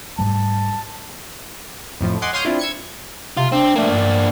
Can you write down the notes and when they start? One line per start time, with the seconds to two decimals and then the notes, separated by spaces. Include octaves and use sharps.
0.19 G#2 G3 A3 A5
2.01 F2 A2 F3
2.22 D#5 F#5 G#5 C6 D6
2.33 C#5 F5 C6 D#6 F6 G6
2.45 C4 D4 E4 F4
2.59 E6 G#6 C#7
3.37 C3 F4
3.52 C4 D4
3.76 A3 A#3 D4
3.90 G2